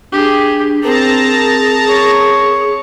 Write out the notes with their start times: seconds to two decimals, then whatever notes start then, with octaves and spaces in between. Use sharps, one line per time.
0.12 D4 G4 G#4
0.83 C4 G#4 A#4 A5 A#5
1.88 C#5